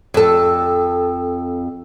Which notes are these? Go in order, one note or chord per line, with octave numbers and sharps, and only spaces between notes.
F2 A4